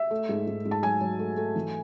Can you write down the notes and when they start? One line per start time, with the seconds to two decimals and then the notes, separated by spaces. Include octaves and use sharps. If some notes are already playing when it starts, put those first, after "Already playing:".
Already playing: E5
0.11 A3
0.29 G#2
0.47 G#2
0.65 G#2
0.71 A5
0.83 F#3 G#5
1.01 F#3
1.19 A3
1.37 A3
1.56 E3